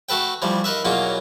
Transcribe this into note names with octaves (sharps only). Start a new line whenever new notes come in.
A3 F#4 A4 B4 G5
E3 F3 G3 A3
D#4 A#4 B4 E5
E2 B2 F#3 A#3 C#4 F4